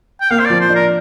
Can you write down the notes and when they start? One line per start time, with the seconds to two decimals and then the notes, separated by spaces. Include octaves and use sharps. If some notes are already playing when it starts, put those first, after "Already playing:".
0.21 G5
0.30 A#3 F5
0.39 C5
0.45 F3 D5
0.60 C5
0.70 D4
0.75 A#4